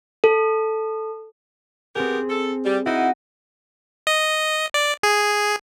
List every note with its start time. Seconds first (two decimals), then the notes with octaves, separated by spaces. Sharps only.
0.24 A4
1.96 B3 C4 G4 G#4 A#4
2.30 A4
2.65 G3
2.86 D#4 E4 F#4 A#6 D#7
4.07 D#5
4.74 D5
5.03 G#4